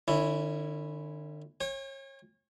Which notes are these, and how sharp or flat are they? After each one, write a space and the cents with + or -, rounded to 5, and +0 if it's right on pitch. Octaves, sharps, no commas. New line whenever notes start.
D3 +45 C#4 +0 E4 +0
C#5 -30 G5 +40